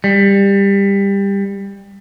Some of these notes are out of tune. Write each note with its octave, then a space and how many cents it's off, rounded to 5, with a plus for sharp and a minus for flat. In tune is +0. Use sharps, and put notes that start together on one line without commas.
G3 +20